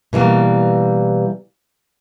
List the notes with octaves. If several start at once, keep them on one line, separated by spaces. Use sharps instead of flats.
B2 E3 G3 A#3